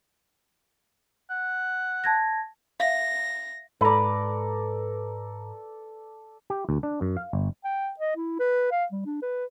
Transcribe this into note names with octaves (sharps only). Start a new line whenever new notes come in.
F#5
A5 G#6 A#6
E5 F5 A#6
G#2 A4 B4 D5 A#5
G4
D2
D4
F#2
F5
G1
G5
D#5
E4
B4
F5
G3
D4
B4